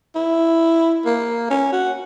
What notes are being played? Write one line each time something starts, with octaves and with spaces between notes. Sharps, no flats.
E4
A#3
C#4
F#4